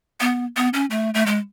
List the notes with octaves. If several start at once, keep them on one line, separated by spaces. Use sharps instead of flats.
B3
B3
C#4
A3
A3
G#3